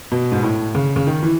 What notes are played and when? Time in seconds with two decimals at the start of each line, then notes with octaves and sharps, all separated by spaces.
0.11 B2
0.32 G#2
0.43 A2
0.75 C#3
0.96 C#3
1.07 D#3
1.23 E3